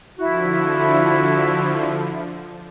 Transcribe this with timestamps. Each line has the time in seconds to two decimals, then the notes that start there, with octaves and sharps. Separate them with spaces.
0.19 D3 F3 E4 F#4